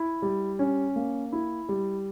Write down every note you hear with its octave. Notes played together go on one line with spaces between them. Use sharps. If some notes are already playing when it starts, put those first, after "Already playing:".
Already playing: E4
G3
C#4
A#3
E4
G3